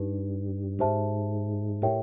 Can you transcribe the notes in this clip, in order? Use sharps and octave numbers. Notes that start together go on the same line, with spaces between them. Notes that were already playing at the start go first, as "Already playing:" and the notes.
Already playing: G2 D#4 G4 B4
G#2 G4 C5 E5 A5
A2 G4 A#4 C#5 E5 G5